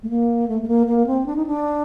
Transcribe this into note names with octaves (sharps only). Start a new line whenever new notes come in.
A3
A#3
A3
A3
A#3
A#3
C4
D4
D#4
D4